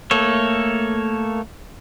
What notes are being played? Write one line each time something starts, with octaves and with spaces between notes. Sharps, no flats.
A3 A#3 A4 C#5